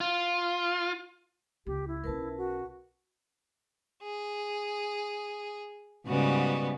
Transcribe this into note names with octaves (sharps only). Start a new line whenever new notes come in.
F4
C#2 G4
E4
B1 C#4 A#4 B4 A5
F#4
G#4
G#2 C#3 G3 B3 F#4